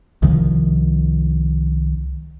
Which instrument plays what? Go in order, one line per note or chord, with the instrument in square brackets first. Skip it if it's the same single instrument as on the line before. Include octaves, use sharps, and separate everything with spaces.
[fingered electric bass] C2 D#3 F3